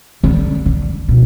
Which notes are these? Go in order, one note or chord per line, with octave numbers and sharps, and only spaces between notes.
D3
D3
B2